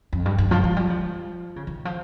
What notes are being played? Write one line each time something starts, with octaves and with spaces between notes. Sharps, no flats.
F2
G2
G2
F3
F3
G3
F3
C#3
D#3
F3